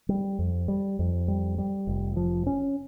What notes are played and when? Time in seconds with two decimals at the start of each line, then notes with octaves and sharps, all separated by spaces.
0.09 G3
0.39 F2
0.68 G3
0.99 F2
1.28 G3
1.58 G3
1.87 F1
2.16 F3
2.47 C#4